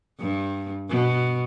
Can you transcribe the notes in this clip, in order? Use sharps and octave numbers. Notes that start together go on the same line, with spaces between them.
G2
B2